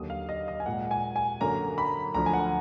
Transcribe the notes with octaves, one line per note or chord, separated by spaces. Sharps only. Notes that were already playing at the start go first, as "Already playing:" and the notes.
Already playing: D#2 D3 F#3 A#3 D#6
F5
D#5
D#5
G#5
A#2 G#3 F#5
G#5
G#5
F#2 D3 F#3 A#3 A#5
B5
D2 D3 F3 A#5
G#5
F#5